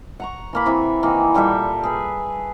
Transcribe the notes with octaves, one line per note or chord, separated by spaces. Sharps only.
F#5 A#5 C#6
E3 A#3 B5
C3 E3 E4 E5
D#3 E3 A#3
A#2 G3 A4 E5
G#4 B4